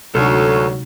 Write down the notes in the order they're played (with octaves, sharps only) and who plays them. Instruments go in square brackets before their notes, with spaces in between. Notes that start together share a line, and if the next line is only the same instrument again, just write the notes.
[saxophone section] D2 [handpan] C3 G#3 D#4 [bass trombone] F#3 [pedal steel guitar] A4 C#6